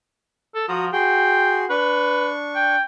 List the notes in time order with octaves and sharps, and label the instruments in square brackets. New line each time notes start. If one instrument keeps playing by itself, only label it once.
[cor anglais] A4
[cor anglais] F3 [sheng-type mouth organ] F#4 A#5 D#6
[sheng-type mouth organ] F#4 G#4 C6 [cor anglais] G5
[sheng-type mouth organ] D4 C#6 [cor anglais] B4
[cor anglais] G5